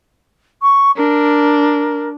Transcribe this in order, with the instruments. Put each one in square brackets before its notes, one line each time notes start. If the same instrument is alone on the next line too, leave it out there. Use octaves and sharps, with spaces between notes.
[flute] C#6
[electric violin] D4 [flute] A#4